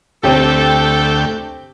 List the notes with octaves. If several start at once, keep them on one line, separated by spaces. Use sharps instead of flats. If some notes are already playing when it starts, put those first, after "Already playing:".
D2 A3 C4 G4 A4 G5